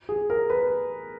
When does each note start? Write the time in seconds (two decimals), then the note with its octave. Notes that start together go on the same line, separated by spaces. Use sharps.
0.09 G#4
0.30 A#4
0.50 B4